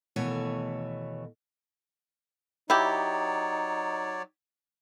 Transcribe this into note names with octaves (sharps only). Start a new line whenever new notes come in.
D#2 B2 E3 A3 C#5
F#3 D#4 E4 G4 C#5 D5